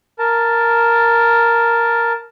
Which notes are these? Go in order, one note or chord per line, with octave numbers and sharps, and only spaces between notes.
A#4 A5